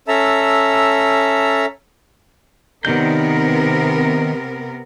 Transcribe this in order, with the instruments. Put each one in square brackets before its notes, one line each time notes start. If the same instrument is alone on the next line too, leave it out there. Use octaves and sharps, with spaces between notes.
[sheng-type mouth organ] C#4 A4 E5 A5 A#5 E6
[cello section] C3 B3 A#4 [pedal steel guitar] D#3 D5 G6